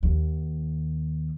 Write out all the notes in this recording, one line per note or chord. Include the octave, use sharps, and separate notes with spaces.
D#2